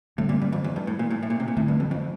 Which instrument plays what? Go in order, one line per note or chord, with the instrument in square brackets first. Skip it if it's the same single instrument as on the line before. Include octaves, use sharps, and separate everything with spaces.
[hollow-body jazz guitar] A2 [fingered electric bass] D3 G3 C4
[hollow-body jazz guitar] A#2
G2
F2
E2
G2
A2
A#2
A2
A2
A#2
C3
A#2
[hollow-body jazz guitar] A2 [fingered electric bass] D3 A3 C4
[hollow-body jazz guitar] G2
F2
F2